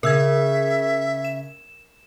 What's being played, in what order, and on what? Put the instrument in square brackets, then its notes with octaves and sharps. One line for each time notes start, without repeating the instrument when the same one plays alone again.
[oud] C#3 [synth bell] A#4 E6 G#6 [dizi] E5
[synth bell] E7